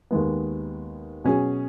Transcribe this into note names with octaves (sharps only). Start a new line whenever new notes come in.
D#2 D#3 G#3 B3
B2 F#3 C#4 G#4